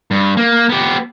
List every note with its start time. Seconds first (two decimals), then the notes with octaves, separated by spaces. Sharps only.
0.11 G2
0.37 A#3
0.69 B3 G4